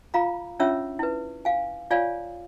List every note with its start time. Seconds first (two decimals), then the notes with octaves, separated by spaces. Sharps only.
0.14 F4 F5 A#5 B5
0.60 C#4 D4 F4 C#5 E5 E6
0.99 E4 B4
1.45 F5 G#5
1.91 F4 C#5 D5 F5 G#5